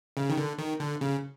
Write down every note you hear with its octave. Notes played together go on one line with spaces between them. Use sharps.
C#3
D#3
D3
D#3
D3
C#3